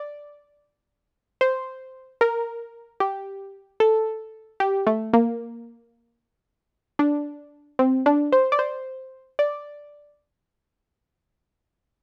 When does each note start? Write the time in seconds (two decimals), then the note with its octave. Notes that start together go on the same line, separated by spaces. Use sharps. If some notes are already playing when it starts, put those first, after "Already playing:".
Already playing: D5
1.41 C5
2.21 A#4
3.00 G4
3.80 A4
4.60 G4
4.87 A3
5.13 A#3
6.99 D4
7.79 C4
8.06 D4
8.32 C5
8.52 D5
8.59 C5
9.39 D5